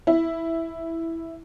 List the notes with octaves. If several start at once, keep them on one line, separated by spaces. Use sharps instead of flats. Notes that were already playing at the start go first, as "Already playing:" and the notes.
E4